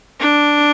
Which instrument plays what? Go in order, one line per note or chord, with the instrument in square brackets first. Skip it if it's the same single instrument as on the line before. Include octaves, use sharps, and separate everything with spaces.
[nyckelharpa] D4